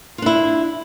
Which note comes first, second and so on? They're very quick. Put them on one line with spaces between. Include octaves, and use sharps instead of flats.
F4 D4 E4